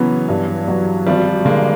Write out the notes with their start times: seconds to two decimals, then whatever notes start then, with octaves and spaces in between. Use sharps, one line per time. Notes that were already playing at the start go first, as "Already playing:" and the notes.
Already playing: C#3 E3 F#3 B3
0.29 G2
0.68 F#3
1.06 G#1 F3 G3
1.45 D3 G#3 A#3